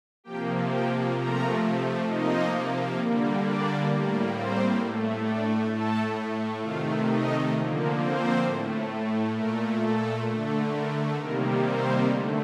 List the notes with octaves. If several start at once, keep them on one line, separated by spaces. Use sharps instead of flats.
C3 F3 A#3 G4 G5
G4 G5
C3 F3 A3 A#4 A#5
C3 F3 A#3 D#4 D#5
D3 G3 A#3
D4 D5
A2 G3 A#3
C4 C5
A2 A3
D4 D5
A2 A3 A4 A5
C3 D#3 A3 F4 F5
D#4 D#5
D3 F3 A#3
C4 C5
A2 A3
A#2 A3 A#4
A4
D3 A3
A#4
C3 D#3 G3 A#3 A#4
C4 C5
D3 A3